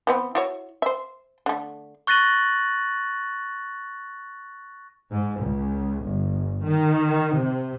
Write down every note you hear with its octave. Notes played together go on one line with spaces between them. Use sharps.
E3 B3 C4
E4 F#4 C#5
C5 E5
D3 A3
C#6 F#6 A6 A#6 D#7 F#7
G#2
C#2
G1
D#3
C3